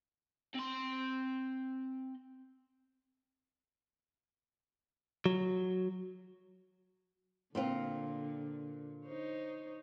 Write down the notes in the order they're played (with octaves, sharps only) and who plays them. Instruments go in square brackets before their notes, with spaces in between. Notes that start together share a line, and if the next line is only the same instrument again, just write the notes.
[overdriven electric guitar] C4 C6
[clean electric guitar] F#3
[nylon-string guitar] A#2 C4 F4 [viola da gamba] D3
[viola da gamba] D#4 C5 C#5